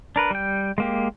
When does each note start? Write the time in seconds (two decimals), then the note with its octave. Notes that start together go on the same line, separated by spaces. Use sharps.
0.16 D4 A#4 B4
0.31 G3 G5
0.78 G#3 A#3 G4